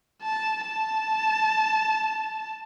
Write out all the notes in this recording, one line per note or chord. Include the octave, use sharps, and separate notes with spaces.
A5
A5